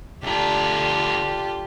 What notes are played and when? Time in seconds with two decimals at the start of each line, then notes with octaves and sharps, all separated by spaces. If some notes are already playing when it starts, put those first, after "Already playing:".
0.23 D2 D3 D4 F4 G4 A#5